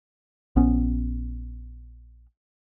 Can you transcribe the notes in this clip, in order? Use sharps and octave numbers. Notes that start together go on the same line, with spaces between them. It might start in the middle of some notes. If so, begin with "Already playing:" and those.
A#1 B3 C#4